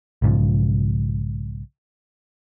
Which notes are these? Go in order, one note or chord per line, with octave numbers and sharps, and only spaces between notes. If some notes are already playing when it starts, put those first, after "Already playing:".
B1 G#2 C#3 F3